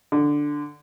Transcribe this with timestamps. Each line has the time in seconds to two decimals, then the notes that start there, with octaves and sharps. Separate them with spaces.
0.12 D3